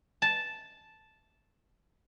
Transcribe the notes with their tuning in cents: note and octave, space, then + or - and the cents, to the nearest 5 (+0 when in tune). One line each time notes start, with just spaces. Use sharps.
A5 -5